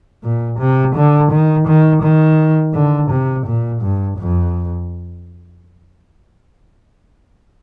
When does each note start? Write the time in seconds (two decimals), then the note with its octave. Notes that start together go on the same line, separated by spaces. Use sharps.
0.23 A#2
0.59 C3
0.95 D3
1.31 D#3
1.67 D#3
2.02 D#3
2.74 D3
3.10 C3
3.46 A#2
3.81 G2
4.18 F2